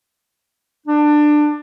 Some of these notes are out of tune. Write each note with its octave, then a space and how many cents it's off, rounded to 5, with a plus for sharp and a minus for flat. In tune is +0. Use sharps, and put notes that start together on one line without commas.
D4 +20